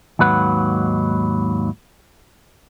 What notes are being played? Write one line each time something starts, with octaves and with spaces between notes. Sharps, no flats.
D#2 G#2 F#3 B4 F#5